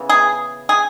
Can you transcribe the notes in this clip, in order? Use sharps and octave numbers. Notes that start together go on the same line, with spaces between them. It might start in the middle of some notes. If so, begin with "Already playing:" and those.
Already playing: C#3 E3 B3
G#4
G#4